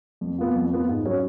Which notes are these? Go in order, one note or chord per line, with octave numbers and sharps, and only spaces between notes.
F2
F3 B3 F4
F2
F3 B3 F4
G#2
F#3 C#4